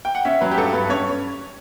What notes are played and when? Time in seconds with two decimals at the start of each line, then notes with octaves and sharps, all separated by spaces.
0.05 G5
0.15 F#5
0.25 C#4 E5
0.41 F#3 B4
0.51 G4
0.57 G2 A4
0.73 G2 B4
0.89 C#4 C#5